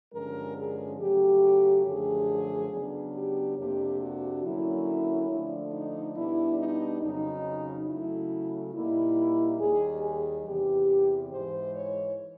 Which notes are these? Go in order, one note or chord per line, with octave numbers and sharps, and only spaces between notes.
G2 D3 F3 G#3 C#4 A#4
G#4
C#3 F#3 A3 G4
F#2 D3 F3 A3 D4 G#4
C#3 F#3 B3 D4
G4
F2 C3 F3 A#3 D4 G4
F#4
D3 F#3 A#3 C#4 E4
D3 F3 A3 D4
D#4
B2 G3 B3 D4 E4
D#4
F2 C#3 F#3 D#4
C#3 F#3 A3 E4
A#2 G3 A#3 D#4 E4
D#2 D#3 G3 G#4
G#4
E2 C3 E3 G4
G#2 E3 G#3 C5
C#5